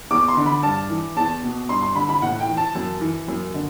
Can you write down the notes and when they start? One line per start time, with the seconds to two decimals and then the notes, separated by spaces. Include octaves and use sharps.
0.11 E2 D6
0.28 C6
0.37 D3
0.46 B5
0.63 G2 A5
0.90 E3
1.16 E2 A5
1.43 B2
1.69 G2 C6
1.83 C6
1.95 D3 B5
2.09 B5
2.22 A2 F#5
2.40 G5
2.48 E3
2.57 A5
2.75 F#2
3.01 E3
3.28 F#2
3.54 D3